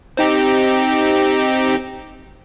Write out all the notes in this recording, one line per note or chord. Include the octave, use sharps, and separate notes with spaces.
C4 D#4 G4